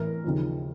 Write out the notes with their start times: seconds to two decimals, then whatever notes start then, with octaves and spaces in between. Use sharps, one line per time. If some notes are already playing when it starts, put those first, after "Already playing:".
Already playing: A1 A2 E3 A#4
0.24 D#2 C#3 F3